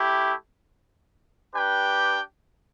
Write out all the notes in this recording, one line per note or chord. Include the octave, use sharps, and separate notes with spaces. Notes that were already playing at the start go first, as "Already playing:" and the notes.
Already playing: A3 E4 G4
D4 G4 B4 G5